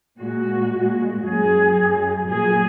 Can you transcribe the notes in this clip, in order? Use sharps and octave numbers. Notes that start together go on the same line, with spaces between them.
A#2 G#3 F#4
A#2 G#3
F#2 F#3 G#4
F#2 F#3
A#2 F#3 G#4